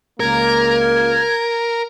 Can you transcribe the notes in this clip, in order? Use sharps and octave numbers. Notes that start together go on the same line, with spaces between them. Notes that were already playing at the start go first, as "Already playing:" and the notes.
C#2 A#3 A#4 G#6